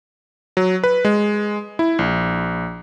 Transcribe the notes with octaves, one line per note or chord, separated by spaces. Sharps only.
F#3
B4
G#3
E4
A#1